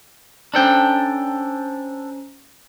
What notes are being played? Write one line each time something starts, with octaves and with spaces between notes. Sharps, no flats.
C#4 D4 A4 C5 G5 A#5